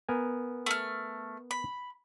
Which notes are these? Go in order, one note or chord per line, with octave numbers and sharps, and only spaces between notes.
B3 A#4 G#5
A3 F6
B5